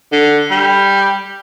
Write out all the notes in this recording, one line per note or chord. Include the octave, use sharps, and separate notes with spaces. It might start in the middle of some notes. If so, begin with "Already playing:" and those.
D3
G3